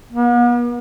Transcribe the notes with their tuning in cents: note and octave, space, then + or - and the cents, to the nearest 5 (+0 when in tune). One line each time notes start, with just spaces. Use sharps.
B3 -45